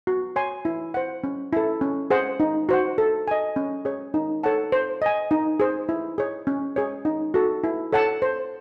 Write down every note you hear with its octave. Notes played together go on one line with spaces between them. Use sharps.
F#4
C#5 G#5 C6
E4
C5 F#5
C#4
E4 A4
C#4
G#4 C5 F#5
D#4
F#4 C5 F#5
A4
D#5 G#5
C#4
G#4 C#5
D#4
A4 C#5 F#5 A5
C5
D#5 G#5
D#4
G#4 C5
E4
G#4 C#5
C#4
G#4 C#5
D#4
F#4 A4
E4
A4 C#5 F#5 A5
C5